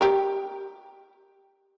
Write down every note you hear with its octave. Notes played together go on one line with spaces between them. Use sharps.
G4 A#4